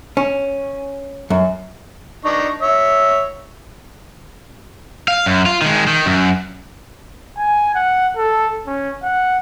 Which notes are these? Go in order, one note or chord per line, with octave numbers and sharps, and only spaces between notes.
C#4
F#2
D4 D#4 C#6
C#5 E5
F5
F#2
F4
D#3 G#3
D#3
F#2
G#5
F#5
A4
C#4
F#5